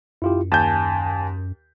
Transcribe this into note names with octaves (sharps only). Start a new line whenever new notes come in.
F#2 E4 F4 G4
D#2 G#5 A5 G6